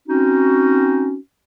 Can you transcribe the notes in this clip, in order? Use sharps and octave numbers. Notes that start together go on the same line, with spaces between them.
C4 C#4 D#4 F#4